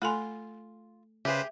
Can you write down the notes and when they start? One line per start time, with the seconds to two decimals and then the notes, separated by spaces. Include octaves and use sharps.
0.02 A3 F4 A4 G#5 B5 C6
1.25 C#3 G4 G#4 B4 C5 E5